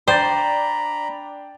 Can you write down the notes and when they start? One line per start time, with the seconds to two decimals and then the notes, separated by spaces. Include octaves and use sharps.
0.08 D4 C5 D5 G5 A#5 B5 A6